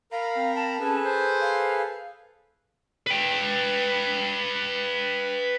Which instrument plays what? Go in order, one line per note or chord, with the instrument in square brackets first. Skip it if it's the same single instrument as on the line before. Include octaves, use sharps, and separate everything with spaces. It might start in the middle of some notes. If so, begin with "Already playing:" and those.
[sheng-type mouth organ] A#4 A#5 B5 [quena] F5
[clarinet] C4
[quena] A5
[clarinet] C#4 [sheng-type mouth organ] G#4 A4 B4
[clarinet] C5
[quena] F5
[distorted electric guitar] B4 G5